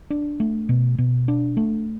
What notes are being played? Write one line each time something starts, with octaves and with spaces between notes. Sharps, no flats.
D4
A3
B2
B2
D4
A3